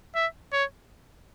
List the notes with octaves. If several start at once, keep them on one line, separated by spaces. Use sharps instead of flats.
E5
C#5